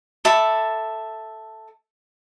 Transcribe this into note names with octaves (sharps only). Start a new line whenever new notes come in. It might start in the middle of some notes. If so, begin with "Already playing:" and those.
A4 E5 B5 D6